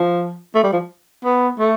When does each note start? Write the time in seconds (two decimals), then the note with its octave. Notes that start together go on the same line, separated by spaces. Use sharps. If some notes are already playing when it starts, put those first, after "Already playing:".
Already playing: F3
0.55 A3
0.63 G3
0.72 F3
1.24 B3
1.59 A3